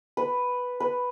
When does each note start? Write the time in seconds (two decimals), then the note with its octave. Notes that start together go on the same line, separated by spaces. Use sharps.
0.17 B4
0.80 B4